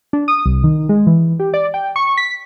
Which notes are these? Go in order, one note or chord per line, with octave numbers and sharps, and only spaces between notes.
D4
D#6
C2
D#3
G#3
E3
G4
D5
G5
C#6
B6